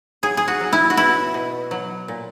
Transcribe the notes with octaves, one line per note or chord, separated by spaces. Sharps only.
F#3 G#4
G#4
F#4
F#3
E4
F#4
B2 E4
B2
F#3
A#2